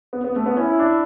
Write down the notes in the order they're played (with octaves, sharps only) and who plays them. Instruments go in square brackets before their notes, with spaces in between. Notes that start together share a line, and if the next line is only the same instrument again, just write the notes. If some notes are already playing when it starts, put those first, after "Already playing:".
[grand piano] B3
B3
A3
B3
[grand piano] C#4 [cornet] E4
[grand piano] D4